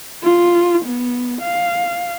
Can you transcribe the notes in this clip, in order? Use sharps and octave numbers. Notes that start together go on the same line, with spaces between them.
F4
B3
F5